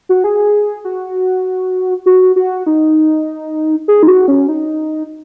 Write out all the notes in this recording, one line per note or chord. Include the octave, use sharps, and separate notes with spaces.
F#4
G#4
F#4
F#4
F#4
D#4
G#4
D#4
F#4
C#4
D#4